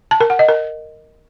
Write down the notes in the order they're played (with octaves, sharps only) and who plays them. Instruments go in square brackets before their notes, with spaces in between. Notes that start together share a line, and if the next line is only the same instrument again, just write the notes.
[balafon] A5
A#4
F#5
D#5
A#4